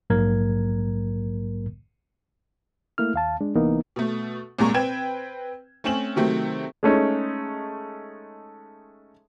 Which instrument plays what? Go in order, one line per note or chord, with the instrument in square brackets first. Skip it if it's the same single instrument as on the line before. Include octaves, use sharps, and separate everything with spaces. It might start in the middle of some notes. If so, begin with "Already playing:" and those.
[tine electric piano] A#1 G#2 F#3 A#3 A#4 G#6
[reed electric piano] A3 A#3 E4 F6
D#2 F5 A5
G#3 D4
C2 E3 A#3 B3 D#4 A#4
[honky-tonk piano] B2 A3
C2 A#2 G#3 A#5 C#6
C4 B4 G5 G#6 E7
A3 C4 C#4 E7 F#7
C3 D#3 F#3 A3 C4
[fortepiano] G#3 A3 C#4 D#4